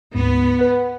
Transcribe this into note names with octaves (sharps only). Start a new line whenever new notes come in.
D2 G#2 B3
B4 F#5 B5